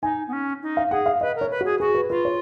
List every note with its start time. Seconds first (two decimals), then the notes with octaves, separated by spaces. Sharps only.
0.03 D#4 G#5
0.28 B3
0.33 C#4
0.63 D#4
0.77 F5
0.91 G#4 F#5
1.06 F5
1.21 B4 D#5
1.36 A#4
1.41 C#5
1.51 B4
1.61 F#4 G#4
1.80 F#4 G#4
1.95 B4
2.10 F4 B4
2.25 C#5